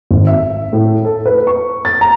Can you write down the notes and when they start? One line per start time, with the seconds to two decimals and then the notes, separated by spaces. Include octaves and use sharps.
0.11 G#1
0.27 E5
0.73 A2
1.05 A4
1.26 B4
1.47 C#6
1.85 A6
2.01 A#5